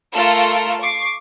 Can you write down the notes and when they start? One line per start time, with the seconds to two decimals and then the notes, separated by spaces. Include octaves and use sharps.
0.14 A3 F4 A4 A#4
0.81 C#6 D6 C7